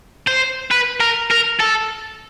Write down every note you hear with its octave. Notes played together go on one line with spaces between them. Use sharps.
C5
B4
A#4
A#4
A4